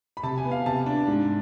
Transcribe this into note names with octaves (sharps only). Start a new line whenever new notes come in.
B5
C3 A5
G#5
B3
F5
C3 A5
D4
G#2